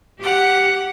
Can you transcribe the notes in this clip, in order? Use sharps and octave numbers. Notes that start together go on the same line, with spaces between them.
G4 F#5